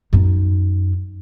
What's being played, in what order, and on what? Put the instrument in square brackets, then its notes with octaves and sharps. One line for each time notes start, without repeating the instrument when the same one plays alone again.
[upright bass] F#2 D#4